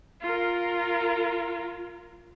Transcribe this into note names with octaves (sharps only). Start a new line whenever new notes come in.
F4 A#4